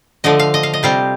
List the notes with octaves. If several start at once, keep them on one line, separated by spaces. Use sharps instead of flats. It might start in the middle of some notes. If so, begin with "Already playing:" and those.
D3 F3 A3 D#5
F5
D#5
F5
D#5
C3 G3 C4 F4 F5